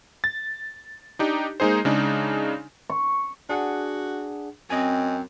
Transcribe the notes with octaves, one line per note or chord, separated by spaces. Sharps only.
A6
D4 D#4 G4
G#3 A#3 D#4 G#4 C5
C#3 G#3 D4 D#4
C#6
D4 F#4 G#4 F#5
F#2 C4 D#5 G#5